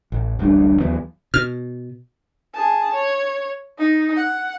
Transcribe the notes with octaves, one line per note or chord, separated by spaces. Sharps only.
A1
D1 A1 G3 D4
D#2 E3 F#3 B3
B2 F6
G#4 A5
C#5
D#4
F#5